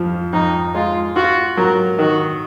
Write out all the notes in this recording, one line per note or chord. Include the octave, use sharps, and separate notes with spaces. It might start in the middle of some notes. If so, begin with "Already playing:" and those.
Already playing: F2 F3
F2 D#4
G#3 F4
F4 F#4
F#3 A#4
D#3 F#4